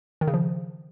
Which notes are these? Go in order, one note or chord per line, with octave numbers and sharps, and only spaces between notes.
D#3
C#3
F3